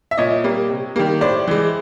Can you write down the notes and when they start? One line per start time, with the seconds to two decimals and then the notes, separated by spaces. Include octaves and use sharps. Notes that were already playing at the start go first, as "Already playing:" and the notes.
0.11 E5
0.18 A#2 C#5 D#5
0.44 G3 A#3
0.69 C3
0.96 D#3 G3 A#3
1.21 A2 C5 D5
1.48 E3 G#3